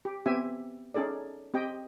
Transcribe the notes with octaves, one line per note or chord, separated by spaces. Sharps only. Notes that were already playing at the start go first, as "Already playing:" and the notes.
G4
B3 C4 G4 E5 G#5
C#4 D#4 G#4 A4 D5
C4 G4 D#5 G5